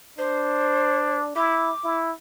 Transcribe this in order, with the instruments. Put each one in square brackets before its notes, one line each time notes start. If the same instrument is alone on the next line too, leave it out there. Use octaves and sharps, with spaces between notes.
[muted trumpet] D4 [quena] C5
[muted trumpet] E4 [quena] D6
[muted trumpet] E4